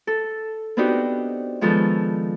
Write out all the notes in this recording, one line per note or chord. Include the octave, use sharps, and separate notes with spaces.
A4
B3 C4 D4 D#4 F#4 G4
D#3 F3 G#3 B3 A4